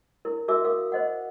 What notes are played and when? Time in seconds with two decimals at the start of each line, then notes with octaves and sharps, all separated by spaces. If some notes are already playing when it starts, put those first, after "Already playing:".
0.25 E4 A#4
0.48 F#4 A#4 E5 A5 D6 E6
0.64 A#4 F5 D#6
0.92 C5 D#5 F#5